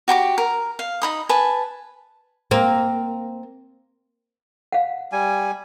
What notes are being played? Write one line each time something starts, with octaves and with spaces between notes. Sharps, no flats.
F#4 G4 A#5 D6
A#4
F5
D#4 B5 D#6
B4 G#5 A5
A#3 C4
F5 F#5
G3 G#5